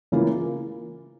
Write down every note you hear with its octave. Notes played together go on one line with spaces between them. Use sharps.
C#3 E3 A#3 F4 A#4